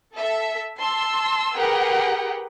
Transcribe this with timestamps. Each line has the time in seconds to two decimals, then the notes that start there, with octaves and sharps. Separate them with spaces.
0.15 A4 E5
0.79 A5 C6 E6
1.56 G4 G#4 A#4 B4 F#5 G5